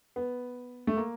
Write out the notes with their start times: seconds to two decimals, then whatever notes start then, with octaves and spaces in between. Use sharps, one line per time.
0.16 B3
0.87 A3
0.97 A#3